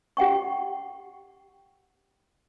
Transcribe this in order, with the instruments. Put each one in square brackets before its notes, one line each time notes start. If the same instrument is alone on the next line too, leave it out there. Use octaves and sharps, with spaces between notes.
[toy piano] G4 F#5 G5 C#6